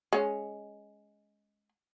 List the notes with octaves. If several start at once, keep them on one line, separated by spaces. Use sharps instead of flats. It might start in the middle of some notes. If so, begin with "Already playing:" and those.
G#3 C#4